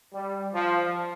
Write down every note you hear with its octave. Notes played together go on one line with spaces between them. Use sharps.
G3
F3